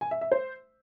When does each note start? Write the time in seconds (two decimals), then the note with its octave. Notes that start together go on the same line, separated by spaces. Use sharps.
0.01 G#5
0.11 E5
0.21 E5
0.32 C5